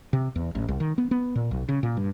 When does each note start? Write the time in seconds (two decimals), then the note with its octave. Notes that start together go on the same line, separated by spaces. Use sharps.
0.13 C3
0.36 E2
0.55 A1
0.68 C2
0.80 D#3
0.98 B3
1.11 B3
1.36 A#2
1.51 B1
1.69 C#3
1.83 A#2
1.97 G2